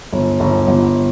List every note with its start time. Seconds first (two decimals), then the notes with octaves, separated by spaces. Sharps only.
0.12 G1
0.40 G1
0.67 G1